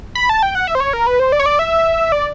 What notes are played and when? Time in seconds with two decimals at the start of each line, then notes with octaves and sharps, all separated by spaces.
0.15 B5
0.29 A5
0.43 G5
0.55 F#5
0.67 E5
0.75 C5
0.80 C#5
0.93 A#4
1.07 B4
1.20 C5
1.32 D5
1.39 C#5
1.46 D5
1.59 E5
2.12 D5